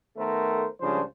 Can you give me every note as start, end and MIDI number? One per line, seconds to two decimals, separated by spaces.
0.17 0.65 51
0.17 0.65 57
0.17 0.65 59
0.17 0.65 69
0.17 0.65 70
0.17 0.65 72
0.81 1.01 37
0.81 1.01 49
0.81 1.01 53
0.81 1.01 55
0.81 1.01 62
0.81 1.01 72